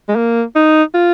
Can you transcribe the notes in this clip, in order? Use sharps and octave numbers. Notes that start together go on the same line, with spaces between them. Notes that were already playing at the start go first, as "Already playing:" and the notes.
G#3
A#3
D#4
F4